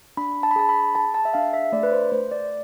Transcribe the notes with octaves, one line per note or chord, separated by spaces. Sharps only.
D4 B5
A5
B5
G#4 A5
B5
G#4 A5
A5
E5
D4 F5
E5
A3 D5
B4
C5
A3 C5
D5